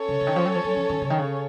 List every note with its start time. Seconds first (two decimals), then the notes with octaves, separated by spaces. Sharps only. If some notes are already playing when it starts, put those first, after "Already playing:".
Already playing: C#4 A4 C#5
0.08 C#3
0.21 C#3
0.27 D#3
0.36 F3
0.45 F#3
0.55 F3
0.64 F#3
0.77 F3
0.89 D#3
1.02 C#3
1.10 D#3
1.18 C#3